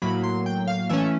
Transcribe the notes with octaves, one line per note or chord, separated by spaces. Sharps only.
A2 F#3 A#3 B5
C6
G5
F5
E3 A3 C#4 E5